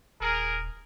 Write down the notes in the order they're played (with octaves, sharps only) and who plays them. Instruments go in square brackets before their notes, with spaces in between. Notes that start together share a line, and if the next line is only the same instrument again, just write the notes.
[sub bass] D#1 [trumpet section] G#4 A#4